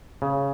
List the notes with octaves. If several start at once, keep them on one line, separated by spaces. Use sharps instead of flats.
C#3